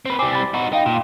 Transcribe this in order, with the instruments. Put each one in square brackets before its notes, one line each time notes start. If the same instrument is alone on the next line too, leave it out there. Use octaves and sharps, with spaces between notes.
[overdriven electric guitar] C4 B4
[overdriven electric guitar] G3 C4 [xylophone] G#5 D6 C7
[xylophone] B5 A6
[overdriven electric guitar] D#4 F#4
[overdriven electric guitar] D#4 [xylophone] F5 G5
[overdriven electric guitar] A#2